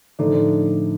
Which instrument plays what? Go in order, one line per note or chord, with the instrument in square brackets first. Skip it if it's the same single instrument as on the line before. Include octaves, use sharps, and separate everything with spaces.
[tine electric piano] A2 F3 A3 D#4 [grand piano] D3 D4